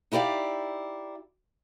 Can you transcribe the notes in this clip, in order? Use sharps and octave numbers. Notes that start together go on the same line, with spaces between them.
D#4 E4 G4 D5 F5